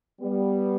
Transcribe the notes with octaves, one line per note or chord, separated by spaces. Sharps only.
G3 B3